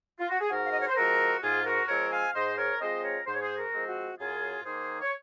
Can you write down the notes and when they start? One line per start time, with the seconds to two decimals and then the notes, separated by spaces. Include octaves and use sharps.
0.19 F4
0.29 F#4
0.40 G#4
0.49 G#2 F#4 A#4
0.65 F5
0.72 D#5
0.80 C#5
0.88 C5
0.95 F3 G#3 C4 F#4 A#4
1.42 G#2 F4 G#4
1.65 F#4 A#4
1.88 F3 G#3 C4 A#4 C#5
2.11 F5 G#5
2.34 G#2 C5 D#5
2.58 A#4 C#5
2.80 F3 G#3 C4 C5 D#5
3.03 A#4 C#5
3.26 G#2 C5
3.34 C#5
3.41 G#4 C5
3.57 F#4 A#4
3.73 F3 G#3 C4
3.87 F#4
4.18 F#2 F4 G#4
4.64 D#3 A#3 G#4 C5
5.01 C#5